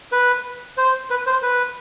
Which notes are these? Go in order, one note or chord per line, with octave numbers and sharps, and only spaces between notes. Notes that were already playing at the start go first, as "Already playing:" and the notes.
B4
C5
B4
C5
B4